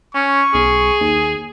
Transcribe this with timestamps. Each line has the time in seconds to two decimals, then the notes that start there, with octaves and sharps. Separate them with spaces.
0.15 C#4 C#6
0.54 B1 G#4
1.01 D#2